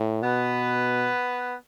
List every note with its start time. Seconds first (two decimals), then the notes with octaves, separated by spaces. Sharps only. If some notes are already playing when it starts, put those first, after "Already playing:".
Already playing: A2
0.22 B2 B3 B4